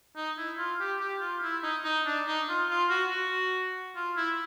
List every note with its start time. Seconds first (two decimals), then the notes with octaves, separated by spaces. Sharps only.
0.16 D#4
0.38 E4
0.58 F4
0.80 G4
1.00 G4
1.21 F4
1.43 E4
1.63 D#4
1.84 D#4
2.06 D4
2.26 D#4
2.49 F4
2.69 F4
2.90 F#4
3.10 F#4
3.96 F4
4.17 E4